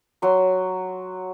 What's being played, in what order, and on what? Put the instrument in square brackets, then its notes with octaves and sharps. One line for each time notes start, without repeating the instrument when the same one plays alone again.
[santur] F#3 C6